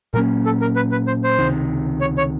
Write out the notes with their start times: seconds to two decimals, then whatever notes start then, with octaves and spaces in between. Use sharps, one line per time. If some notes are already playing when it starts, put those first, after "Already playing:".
0.14 A#2 F#3 A#3 C#4 A#4
0.46 A4
0.61 A#4
0.76 B4
0.92 B4
1.07 C5
1.24 C5
1.39 C#2 C3 D#3
2.01 C#5
2.18 C#5